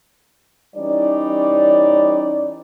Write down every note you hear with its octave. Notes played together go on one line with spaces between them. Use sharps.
E3 G3 C#4 D#4 D5